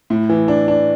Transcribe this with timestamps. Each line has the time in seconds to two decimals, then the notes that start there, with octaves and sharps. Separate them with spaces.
0.10 A2
0.29 E3
0.48 D4
0.68 D4